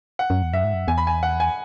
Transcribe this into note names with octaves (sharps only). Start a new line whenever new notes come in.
F#5
F#2
E2
F#2 E5
G#2
F#2
E2 G#5
B5
G#5
F#5
G#5